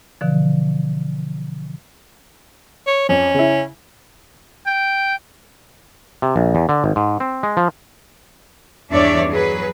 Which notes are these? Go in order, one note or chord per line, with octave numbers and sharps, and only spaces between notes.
B2 D3 E3 F3
C#5
F2 C#4
C#3 E4
G5
C3
A#1
E2
D3
G#1
G#2
C4
G#3
F3
E2 G2 D4 C#5 D5 E5
F#3 G#4 B4